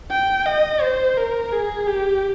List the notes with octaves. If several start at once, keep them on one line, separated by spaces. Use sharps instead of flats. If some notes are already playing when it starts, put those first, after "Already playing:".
G5
D#5
C5
A#4
G#4
G4